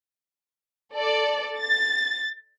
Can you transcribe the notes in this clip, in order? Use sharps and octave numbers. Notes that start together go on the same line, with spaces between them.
A4 D5
A6